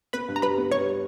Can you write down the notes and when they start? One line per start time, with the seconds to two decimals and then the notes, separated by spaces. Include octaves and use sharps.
0.13 B3 B4 B5
0.28 G2
0.36 A#5
0.42 G3 B4 B5
0.58 B3
0.72 G3 C#5 C#6